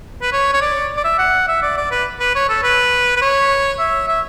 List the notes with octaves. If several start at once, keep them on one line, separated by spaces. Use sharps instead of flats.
B4
C#5
C#5
D5
D5
E5
F#5
E5
D5
D5
B4
B4
C#5
A4
B4
B4
C#5
E5
E5